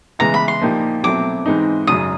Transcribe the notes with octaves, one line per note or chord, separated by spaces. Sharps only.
C#3 E3 G#3 B3 E4 A#5
B5
C6
A#2 F3 A#3 D#4 G4
B2 F#3 A3 C4 E4 D6
G#2 E3 G#3 C4 D#4
G#1 F#2 C#3 F#3 D#6